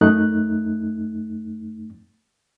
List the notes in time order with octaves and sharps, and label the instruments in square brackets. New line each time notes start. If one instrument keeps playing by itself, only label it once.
[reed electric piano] F#2 A3 D#4 F#6